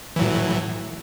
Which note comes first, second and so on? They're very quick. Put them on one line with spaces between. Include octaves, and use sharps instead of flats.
E3 F#3 A2